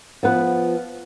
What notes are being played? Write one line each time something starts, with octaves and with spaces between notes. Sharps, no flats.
F3 B3 B4